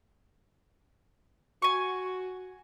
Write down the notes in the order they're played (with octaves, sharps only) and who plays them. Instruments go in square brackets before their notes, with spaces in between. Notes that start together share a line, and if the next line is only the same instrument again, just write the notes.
[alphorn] F#4 [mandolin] G#5 C#6